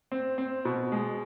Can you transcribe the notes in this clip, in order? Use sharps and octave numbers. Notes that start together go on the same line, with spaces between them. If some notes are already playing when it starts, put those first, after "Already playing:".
C4
C4
B2
G#3